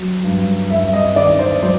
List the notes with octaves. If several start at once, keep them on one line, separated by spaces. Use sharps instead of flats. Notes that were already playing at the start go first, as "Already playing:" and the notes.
Already playing: F#3
G2
G2 E5
D#5
D#3 D5
C5
F#3 C5